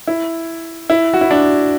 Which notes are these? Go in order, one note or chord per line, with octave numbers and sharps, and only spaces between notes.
E4
E4
F#4
E4
D4